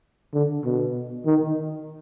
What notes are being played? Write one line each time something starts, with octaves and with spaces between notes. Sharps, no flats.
D3
B2
D#3